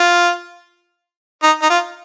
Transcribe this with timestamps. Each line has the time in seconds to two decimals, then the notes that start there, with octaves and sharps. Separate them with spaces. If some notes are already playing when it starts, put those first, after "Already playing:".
Already playing: F4
1.43 D#4
1.62 D#4
1.70 F4